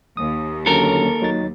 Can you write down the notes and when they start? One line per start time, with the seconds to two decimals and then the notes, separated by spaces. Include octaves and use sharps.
0.17 D#2 D#6
0.66 D3 F#3 C#4 A4 A#4
1.22 F#3 D#4 A6